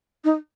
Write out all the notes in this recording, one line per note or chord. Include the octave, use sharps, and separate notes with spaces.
D#4